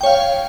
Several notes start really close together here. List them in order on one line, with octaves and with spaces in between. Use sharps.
G5 C#5 F5